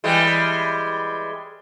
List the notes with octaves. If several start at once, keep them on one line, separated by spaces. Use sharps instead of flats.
E3 G3 G#3